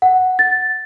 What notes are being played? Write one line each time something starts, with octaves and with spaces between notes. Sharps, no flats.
F#5
A6